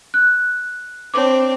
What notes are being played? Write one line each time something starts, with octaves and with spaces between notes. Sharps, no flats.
F#6
C4 D4 C#5 D6